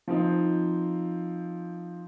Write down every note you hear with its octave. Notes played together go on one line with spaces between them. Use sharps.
F3 C4 D#4